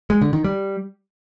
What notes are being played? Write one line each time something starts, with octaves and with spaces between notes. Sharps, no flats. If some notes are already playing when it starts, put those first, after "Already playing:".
G#3
D3
D#3
G3